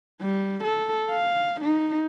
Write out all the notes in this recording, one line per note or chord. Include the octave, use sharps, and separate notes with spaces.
G3
A4
F5
D#4